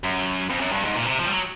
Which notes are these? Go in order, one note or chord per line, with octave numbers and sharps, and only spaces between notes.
F#2
F2
F#2
G2
G#2
A#2
C3
F3
G3
F#3